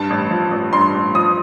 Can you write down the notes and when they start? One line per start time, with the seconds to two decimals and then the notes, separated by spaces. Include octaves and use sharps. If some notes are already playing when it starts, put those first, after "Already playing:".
Already playing: G2 A5
0.10 A1
0.31 F3
0.51 A1
0.73 G2 C6
0.94 A1
1.15 F3 D#6